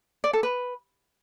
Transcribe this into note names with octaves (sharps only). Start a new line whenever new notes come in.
D5
A4
B4